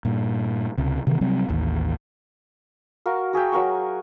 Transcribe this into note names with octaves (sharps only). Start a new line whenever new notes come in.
G2 A#2
C#2 C3
C3 D#3 E3 B3
C3 F#3 G3 C4
A1 D#2
F#4 A#4 F5
F#4 G#4 E5 G5
F#3 A#4 F5 C#6